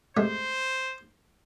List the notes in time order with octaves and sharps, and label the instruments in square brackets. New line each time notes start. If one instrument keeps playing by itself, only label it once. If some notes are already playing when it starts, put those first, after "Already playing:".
[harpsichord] C3 G#3 A3 [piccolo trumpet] C5